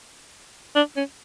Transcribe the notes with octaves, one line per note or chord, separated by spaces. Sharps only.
D4
C#4